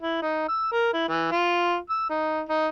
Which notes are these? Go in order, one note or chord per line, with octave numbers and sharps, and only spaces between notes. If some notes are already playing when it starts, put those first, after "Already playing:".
E4
D#4
E6
A#4
E4
E3
F4
E6
D#4
D#4